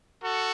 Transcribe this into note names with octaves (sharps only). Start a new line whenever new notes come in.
F#4 A4